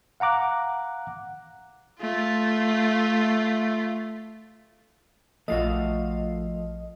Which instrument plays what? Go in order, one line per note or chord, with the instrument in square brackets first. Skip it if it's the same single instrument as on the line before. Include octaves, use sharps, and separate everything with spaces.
[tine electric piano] F5 F#5 A#5 D6 F#6
[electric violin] A3 F4
[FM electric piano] A#1 D#5 [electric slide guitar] F3 F5 [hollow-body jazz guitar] A3 F4 F#4